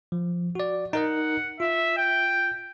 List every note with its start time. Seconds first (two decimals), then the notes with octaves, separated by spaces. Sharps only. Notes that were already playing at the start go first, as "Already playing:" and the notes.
0.12 F3
0.55 F#4 D5
0.93 D#4 A#4 D#5 F#5
1.60 F4 E5
1.97 G5